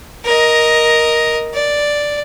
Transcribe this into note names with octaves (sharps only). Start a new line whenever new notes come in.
A#4 D#5
D5